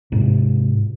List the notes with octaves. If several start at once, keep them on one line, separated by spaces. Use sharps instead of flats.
G#2 C3